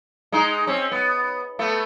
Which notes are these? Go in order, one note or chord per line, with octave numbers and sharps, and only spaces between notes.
G#3 D#4
C4 C#4
B3
A3 B3